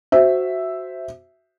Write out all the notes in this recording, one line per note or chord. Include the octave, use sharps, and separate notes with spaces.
F#4 C5 E5